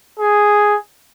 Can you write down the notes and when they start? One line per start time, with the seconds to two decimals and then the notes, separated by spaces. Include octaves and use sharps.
0.19 G#4